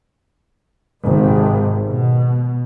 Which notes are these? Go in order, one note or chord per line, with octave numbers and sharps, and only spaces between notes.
G#1 C3
B2